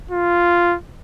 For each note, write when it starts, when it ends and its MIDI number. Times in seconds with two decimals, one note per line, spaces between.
0.11 0.77 65